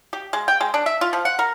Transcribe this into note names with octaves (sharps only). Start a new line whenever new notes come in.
G4
G#3
G5
G#3
D4
E5
F4
F3
F#5
A#4